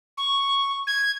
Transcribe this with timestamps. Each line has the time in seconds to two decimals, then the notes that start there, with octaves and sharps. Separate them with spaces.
0.18 C#6
0.87 G#6